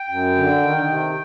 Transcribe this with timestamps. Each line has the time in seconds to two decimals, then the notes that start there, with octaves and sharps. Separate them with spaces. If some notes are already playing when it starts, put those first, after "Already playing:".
Already playing: G5
0.09 F#2
0.35 D3
0.62 D#3
0.88 C3